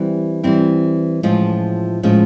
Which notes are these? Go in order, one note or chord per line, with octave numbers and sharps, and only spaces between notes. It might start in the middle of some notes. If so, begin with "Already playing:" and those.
Already playing: E3 G3 C4 E4
E3 G3 C4 E4
A2 F3 G#3 C#4 F4
A2 F3 G#3 C#4 F4